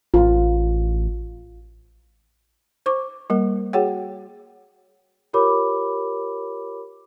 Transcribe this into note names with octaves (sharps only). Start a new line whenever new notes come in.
A1 F4
C5 C#6 D6
G3 A#3 A#4
F#4 G#4 C#5 F#5 G5
F4 G4 A#4 C#5 B5 D6